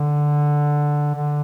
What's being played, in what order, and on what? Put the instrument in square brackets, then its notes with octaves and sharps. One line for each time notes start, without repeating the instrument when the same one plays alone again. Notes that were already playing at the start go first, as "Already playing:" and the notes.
Already playing: [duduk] D3
D3